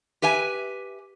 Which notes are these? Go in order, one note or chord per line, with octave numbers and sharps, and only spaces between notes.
G4 B4 E5 G#5